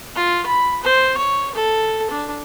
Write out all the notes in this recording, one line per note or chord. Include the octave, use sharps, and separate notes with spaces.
F4
B5
C5
C#5
A4
D4